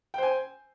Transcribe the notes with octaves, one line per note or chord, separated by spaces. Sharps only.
C5 G5 G#5